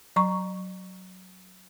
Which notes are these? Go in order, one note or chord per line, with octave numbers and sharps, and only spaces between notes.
F#3 A#5 C#6